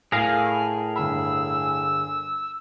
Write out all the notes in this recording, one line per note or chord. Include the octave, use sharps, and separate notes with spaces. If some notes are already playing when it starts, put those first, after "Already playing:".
A2 G#4 A#4 F5 G#5 A#6 F7
G1 B5 E6